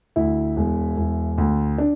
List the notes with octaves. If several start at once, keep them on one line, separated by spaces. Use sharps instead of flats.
D2 E4
E1
E1
D2
D4